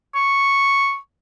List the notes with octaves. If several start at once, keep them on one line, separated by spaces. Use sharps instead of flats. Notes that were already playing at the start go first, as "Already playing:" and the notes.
C#6